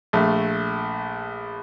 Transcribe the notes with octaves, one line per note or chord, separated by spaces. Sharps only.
A#1 A3